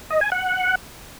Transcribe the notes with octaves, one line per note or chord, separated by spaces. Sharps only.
D#5
G#5
F#5